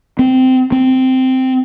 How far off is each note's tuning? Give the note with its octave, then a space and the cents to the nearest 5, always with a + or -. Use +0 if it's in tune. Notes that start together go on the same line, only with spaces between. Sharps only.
C4 -15
C4 -10